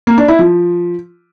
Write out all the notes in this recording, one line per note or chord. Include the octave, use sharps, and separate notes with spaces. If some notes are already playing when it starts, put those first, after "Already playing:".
A#3
D4
E4
F3